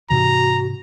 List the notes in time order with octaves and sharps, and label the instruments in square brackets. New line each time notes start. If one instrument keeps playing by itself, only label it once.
[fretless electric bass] G#2 C3 E3 [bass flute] F#4 [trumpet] A#5